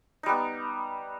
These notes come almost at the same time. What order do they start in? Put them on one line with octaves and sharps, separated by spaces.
D#4 G3 B3